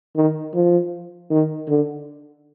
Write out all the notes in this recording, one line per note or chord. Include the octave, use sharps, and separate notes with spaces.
D#3
F3
D#3
D3